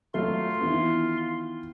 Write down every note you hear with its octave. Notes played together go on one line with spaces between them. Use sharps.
F#3 A3 F4 C6
D#3 E3 B3